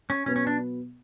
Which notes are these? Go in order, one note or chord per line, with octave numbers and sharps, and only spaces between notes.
C#4
B2 F#3 B3 C#4
C#4
D4